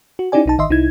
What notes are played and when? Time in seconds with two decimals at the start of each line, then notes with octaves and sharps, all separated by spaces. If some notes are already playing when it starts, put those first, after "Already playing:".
0.19 F#4
0.32 C#4 D#4 E4 G4 D5 G#5
0.46 B1 D#4 A5
0.58 G#1 D#3 D#5 E5 C6
0.70 C2 D#4 E4 G#6